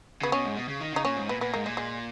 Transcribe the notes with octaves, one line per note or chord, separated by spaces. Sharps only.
C#3 B3
B2 C#4
G#2
B2
C#3
D#3
C#3 D#4
A#2 C#4
G#2
A#2 B3
A#2 B3
G#2 A#3
A#2 G#3
G#3